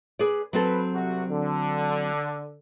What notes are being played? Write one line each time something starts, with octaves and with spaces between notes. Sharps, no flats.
G#4 B4 D5
F#3 C4 A4 B4
C2 F#4
D3